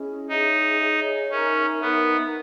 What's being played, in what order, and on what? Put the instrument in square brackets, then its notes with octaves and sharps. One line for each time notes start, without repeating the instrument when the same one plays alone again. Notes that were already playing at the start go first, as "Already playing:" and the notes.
Already playing: [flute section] C#4 E4 G#4 D#5
[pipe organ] D#4 [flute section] G#4 C#5 E5
[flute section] G#4 C#5 E5
[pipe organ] C#4 [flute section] D#4 A#4 E5 A#5
[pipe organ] B3 [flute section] D#4 A#4 E5 A#5